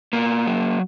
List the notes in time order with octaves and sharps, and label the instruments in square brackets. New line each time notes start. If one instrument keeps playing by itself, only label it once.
[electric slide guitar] B2 A#3
F#3